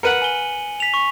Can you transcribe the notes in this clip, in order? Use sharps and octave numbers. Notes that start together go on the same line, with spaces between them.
A#4 B4 F#5 C#7 D#7 F#7
G#5 G7
B6 F7
C#6